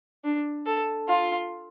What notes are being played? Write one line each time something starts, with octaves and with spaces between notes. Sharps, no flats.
D4
A4
F4